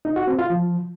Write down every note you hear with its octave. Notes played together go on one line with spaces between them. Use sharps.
D#4
F#4
C4
F4
F3